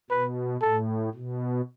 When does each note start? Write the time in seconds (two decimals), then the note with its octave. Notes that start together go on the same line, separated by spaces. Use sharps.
0.10 B2 B4
0.62 A2 A4
1.14 B2